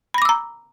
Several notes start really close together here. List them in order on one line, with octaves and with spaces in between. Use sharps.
B5 A#6 D6 E6 A#5